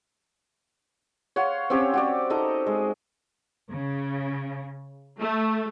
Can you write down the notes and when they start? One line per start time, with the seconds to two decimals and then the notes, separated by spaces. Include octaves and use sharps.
1.36 C#5 F5 F#5 C6
1.70 C4 C#4 G4 C#5
1.94 F#4 G4 D5
2.30 D#4 A4 D#5 A#5
2.66 G#3
3.71 C#3
5.20 A3